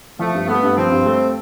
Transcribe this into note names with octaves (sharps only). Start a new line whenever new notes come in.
F3 A3
G2
A3 B3
G2
F3 C4
G2
A3